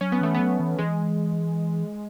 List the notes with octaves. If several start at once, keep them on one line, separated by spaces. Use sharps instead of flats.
F#3 C#4
B3
E3 A3
B3
F#3
E3
E3 G#3